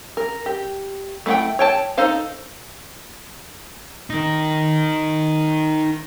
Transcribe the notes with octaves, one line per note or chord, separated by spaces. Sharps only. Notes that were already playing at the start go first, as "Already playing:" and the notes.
A#4
G4
A3 E4 A4 F#5 G5
C#5 G5 A5
D#4 A4 C5 F5
D#4 A#4